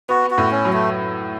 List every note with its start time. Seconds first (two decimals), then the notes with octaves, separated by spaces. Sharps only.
0.09 B3 F#4
0.31 F#4
0.38 A2
0.51 C#4
0.65 F#3
0.73 A3